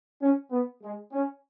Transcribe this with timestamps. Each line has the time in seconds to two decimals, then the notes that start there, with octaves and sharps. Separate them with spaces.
0.21 C#4
0.52 B3
0.83 G#3
1.12 C#4